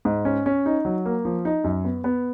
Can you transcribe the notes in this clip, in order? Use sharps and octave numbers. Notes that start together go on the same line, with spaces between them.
G#2
C#4
C#4
D#4
F#3
A#3
F3
D#4
F#2
B3
B3